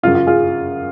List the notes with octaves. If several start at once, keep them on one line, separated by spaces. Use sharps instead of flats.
F#2 C#3 G#3 F4
F4
F4 G#4